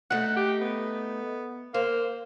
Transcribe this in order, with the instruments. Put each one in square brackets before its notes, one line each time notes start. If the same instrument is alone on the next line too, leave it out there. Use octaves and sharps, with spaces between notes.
[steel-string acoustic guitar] A3 D#4 [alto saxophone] F#5
[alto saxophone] G4
B3
[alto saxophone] A#3 [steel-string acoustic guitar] C5